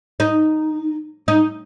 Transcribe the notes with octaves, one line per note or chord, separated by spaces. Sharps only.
D#4
D#4